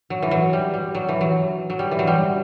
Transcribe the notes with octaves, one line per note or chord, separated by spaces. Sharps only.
F#3
E3
F#3
G3
G3
F#3
E3
F#3
F#3
G3
E3
F#3
G3